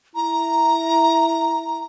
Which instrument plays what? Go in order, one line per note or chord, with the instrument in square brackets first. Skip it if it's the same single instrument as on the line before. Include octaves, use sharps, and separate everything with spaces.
[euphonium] E4 [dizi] A#5